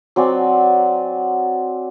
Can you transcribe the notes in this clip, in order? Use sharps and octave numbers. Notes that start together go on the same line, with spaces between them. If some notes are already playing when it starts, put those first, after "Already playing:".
F#3 C4 D5 G#5